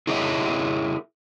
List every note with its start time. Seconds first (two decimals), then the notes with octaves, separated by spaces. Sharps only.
0.07 E4 G#4 A#4 C#5 D#5 E5